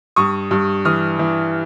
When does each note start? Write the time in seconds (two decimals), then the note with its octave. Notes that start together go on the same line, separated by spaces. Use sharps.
0.16 G2 C#6 D#6
0.51 G2
0.85 E3 D#6 F6
1.19 E3